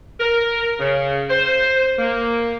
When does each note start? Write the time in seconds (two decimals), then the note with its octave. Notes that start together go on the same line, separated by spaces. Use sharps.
0.20 A#4
0.80 C#3
1.30 C5
1.98 A#3